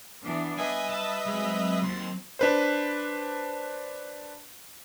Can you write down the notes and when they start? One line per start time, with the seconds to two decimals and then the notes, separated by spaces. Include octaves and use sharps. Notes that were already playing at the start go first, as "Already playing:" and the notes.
0.22 E3 B3 D4
0.58 G3 B4 D#5 E5 G#5
0.90 A5
1.26 F#3 G#3 C4
1.83 D#2 C6
2.39 D4 B4 C5